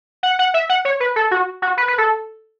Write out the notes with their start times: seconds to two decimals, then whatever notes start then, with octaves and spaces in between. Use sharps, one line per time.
0.23 F#5
0.39 F#5
0.54 E5
0.69 F#5
0.85 C#5
1.00 B4
1.16 A4
1.31 F#4
1.62 F#4
1.77 B4
1.88 B4
1.98 A4